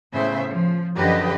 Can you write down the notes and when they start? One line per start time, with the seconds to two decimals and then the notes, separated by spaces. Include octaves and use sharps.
0.13 A2 C#3 B3 C5 E5
0.50 F3
0.96 F#2 D3 F3 G4 B4 D#5